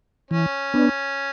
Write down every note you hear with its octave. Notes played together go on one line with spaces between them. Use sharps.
E3 C#4
B3 D4